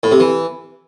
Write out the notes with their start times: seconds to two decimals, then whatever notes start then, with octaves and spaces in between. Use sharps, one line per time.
0.03 A2
0.12 C3
0.20 E3